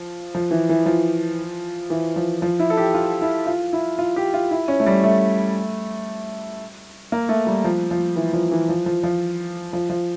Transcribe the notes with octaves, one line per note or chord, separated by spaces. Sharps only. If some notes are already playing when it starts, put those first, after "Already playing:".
Already playing: F3
F3
E3
E3
F3
E3
F3
F3
E4
A4
G4
F4
E4
F4
E4
F4
G4
F4
E4
C#4
A3
G3
A3
A#3
A3
G3
F3
F3
E3
F3
E3
F3
F3
F3
F3
F3